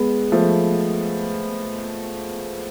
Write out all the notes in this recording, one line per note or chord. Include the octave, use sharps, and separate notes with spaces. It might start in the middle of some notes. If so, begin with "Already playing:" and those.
Already playing: G#3 B3
F3 A3